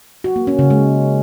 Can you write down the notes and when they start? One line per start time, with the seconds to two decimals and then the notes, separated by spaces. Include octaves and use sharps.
0.24 F#4
0.36 A#3
0.47 C#4
0.59 C#3
0.70 G#3